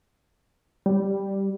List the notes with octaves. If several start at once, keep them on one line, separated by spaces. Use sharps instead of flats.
G3